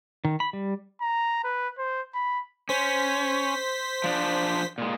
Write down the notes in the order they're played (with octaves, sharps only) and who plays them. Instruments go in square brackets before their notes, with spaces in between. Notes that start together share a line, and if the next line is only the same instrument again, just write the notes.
[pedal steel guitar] D#3
B5
G3
[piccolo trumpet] A#5
B4
C5
B5
[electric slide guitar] C#4 [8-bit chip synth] C5 B6
[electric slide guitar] F3 D4
A#2 G#3